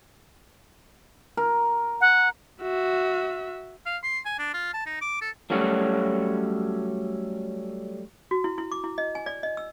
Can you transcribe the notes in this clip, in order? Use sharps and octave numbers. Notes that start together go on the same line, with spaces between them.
A#4
F#5
F#4 E5
F5
C6
G#5
D4
F4
A5
D#4
D6
A4
F#3 G3 A3 C#4 F#4
F#4
E4
E4
D6
E4
D#5
G#5
D5
D#5
E6